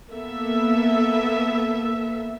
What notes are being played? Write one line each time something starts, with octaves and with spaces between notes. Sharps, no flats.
A#3 B3 A4 E5